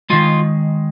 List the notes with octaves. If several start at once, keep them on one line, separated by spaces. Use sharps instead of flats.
D#3 G#3 F4